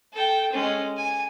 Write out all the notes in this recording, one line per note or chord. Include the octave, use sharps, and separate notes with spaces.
A4 G5
G#3 C#4
G#5